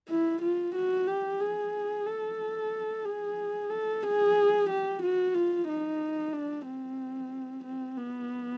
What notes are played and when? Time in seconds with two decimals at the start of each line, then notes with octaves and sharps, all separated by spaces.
0.09 E4
0.42 F4
0.75 F#4
1.08 G4
1.40 G#4
2.06 A4
3.05 G#4
3.70 A4
4.03 G#4
4.69 G4
5.02 F#4
5.35 F4
5.68 D#4
6.33 D4
6.66 C4
7.64 C4
7.97 B3